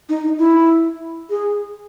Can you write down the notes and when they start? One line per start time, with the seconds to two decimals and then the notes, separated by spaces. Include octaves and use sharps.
0.09 D#4
0.24 D#4
0.39 E4
1.30 G#4